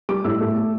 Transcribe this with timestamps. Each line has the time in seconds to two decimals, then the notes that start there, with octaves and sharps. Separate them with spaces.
0.09 G3 D6
0.24 A2 E6
0.41 A3